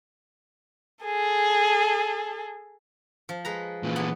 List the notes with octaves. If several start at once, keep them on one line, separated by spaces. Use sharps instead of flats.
G#4 A4
F3
G#3 B4 A#5
A#2 E3
B3